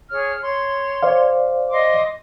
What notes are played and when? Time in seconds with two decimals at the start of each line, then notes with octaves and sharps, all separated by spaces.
0.10 G#4 C#5 F6
0.41 C#5 C6
1.03 C5 D5 F5
1.71 D#5 C6 D6